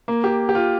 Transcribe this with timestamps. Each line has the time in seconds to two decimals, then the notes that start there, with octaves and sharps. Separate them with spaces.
0.08 A#3
0.24 G4
0.49 G4
0.55 F4